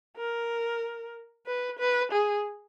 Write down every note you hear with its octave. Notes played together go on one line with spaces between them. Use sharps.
A#4
B4
B4
G#4